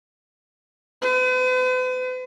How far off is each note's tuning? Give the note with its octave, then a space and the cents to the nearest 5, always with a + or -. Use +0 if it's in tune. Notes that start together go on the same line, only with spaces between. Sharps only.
B4 +45